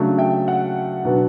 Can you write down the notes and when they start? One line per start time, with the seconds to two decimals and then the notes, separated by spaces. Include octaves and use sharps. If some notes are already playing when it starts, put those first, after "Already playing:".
Already playing: C#3 F#3 A3 D4
0.18 E5 G5
0.48 F#5
1.05 B2 F#3 B3 D4